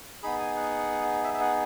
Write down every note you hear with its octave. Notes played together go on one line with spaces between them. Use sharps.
B3 D#4 G#4 B5
G#5
F#5
E5
E5
F#5